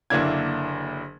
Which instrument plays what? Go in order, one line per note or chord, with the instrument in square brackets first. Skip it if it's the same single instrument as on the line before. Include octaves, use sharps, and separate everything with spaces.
[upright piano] F#1 D3 A#3 D4 E4 G#6